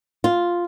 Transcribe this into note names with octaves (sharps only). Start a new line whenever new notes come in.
F4